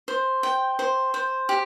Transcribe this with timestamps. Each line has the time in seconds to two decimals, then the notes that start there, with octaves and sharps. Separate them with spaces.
0.08 C5
0.43 G5
0.79 C5
1.14 C5
1.49 G4